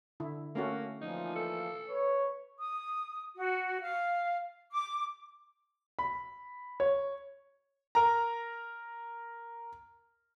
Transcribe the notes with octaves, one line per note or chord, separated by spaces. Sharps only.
D3 E4
A3 A#3 C#4 F#4
A#2 E3 F3 D#4
A4
B4 C#5
D#6
F#4
F5
D6
B5
C#5
A#4 A#5